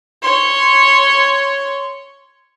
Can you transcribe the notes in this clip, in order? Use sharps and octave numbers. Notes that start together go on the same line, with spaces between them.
C#5 C6